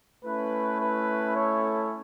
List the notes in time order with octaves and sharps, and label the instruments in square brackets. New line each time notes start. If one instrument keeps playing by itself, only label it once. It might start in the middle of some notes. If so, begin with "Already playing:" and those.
[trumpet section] A3 C#4 E4 B4
B4
A4 C#5